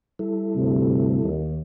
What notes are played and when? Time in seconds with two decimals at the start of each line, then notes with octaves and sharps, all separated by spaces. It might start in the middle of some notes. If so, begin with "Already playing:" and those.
0.19 G3 E4 A4
0.54 D2 G2 C3
1.24 D#2